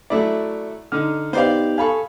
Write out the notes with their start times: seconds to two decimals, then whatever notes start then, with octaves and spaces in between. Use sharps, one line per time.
0.10 F#3 A3 E4 D5
0.92 D3 D#4 F6
1.33 B3 D#4 G4 C5 D5 F5
1.78 A4 F5 G#5 B5 C#6